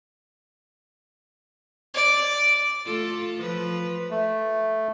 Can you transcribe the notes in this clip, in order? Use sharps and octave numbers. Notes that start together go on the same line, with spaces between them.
D5
A3 F4 A4
F3 B4
A3